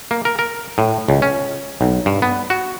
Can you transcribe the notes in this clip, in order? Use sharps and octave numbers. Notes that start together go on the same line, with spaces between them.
A#3
A#4
A#4
A2
C#2
C#4
B1
G2
B3
F#4